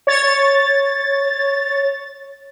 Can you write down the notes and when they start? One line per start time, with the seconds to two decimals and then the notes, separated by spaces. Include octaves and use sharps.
0.07 C#5 A6